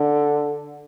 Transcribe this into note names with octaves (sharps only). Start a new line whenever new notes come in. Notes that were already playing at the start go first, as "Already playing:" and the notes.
Already playing: D3